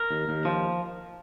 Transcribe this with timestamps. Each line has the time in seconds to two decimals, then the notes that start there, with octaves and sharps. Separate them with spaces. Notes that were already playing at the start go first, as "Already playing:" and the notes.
Already playing: A#4
0.11 D#2
0.29 D#2
0.45 F3